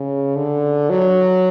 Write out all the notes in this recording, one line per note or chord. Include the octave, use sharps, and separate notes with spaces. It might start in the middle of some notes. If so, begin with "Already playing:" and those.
Already playing: C#3
D3
F#3